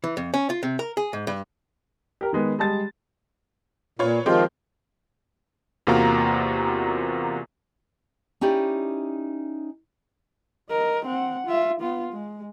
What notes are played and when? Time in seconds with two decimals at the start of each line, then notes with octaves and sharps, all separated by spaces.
0.04 E3
0.17 F2
0.34 C#4
0.50 F4
0.63 C3
0.79 A#4
0.97 G#4
1.13 G#2
1.27 G2
2.21 G4 A#4
2.33 D#3 G#3 B3
2.59 G3 G#3 A5 A6
3.99 A#2 F4 B4 C#5
4.26 D#3 F3 G#3 C4 F4 G4
5.87 E2 C3 A#3 F4 F#4 A#5
8.41 C#4 D#4 E4 G4 D5
10.70 A#4 D#5
11.05 C4 F#5
11.47 F4 E5
11.81 B3 F4
12.13 G#3